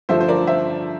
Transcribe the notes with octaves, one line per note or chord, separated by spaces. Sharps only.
G2 D3 F3 A3 C5 E5
C5
A#4 D5
C5 E5